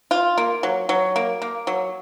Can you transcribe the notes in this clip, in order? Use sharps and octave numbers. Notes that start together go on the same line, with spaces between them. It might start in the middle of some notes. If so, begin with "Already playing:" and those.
F4
A#3
F#3
F#3
A#3
A#3
F#3